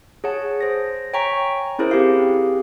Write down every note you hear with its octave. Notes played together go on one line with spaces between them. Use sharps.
G#4 C#5 F#5 A5
C5 A#6
C#5 G5 G#5 A#5 C#6 B6
C#4 E4 G#4 A#4 C5
C4 G4 G#4 F5